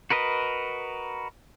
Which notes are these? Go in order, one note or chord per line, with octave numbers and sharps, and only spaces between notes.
F#4 A#4 B4 D#5